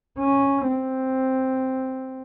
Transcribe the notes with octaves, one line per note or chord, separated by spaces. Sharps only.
C#4
C4